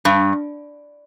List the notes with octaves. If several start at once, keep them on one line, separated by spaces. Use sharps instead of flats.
G2